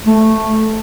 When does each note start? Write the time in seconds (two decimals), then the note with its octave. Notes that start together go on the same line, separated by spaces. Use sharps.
0.07 A3